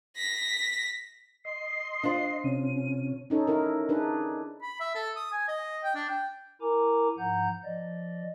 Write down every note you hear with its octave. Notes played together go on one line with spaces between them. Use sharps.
A#6 B6
D#5 C6 C7
D4 F4 C5
C3 C#4 D#7
C#4 D#4 A4 C#5
D#4 E4 A#4
D4 D#4 G#4 B4
B5
E5
A4
D#6
G#5
D#5
G5
D4
G5
E4 A#4 G#5 A#5 D6
G#2 F3 F#5 A#5 G6
F3 D5 D#5